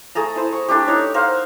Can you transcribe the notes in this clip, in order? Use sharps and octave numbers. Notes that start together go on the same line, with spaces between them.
A3 G#4 A4 A#5
E4 C5
C#6
A3 D4 E4 G4
D#4 C#5
A#4 C5 F5 F#5